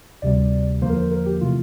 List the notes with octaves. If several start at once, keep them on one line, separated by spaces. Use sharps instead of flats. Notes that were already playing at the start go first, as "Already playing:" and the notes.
D2 C3 G3 D5
E2 D3 F3 A#3 C5
A#4
C5
A#4
G4
C3 E3 A3 F4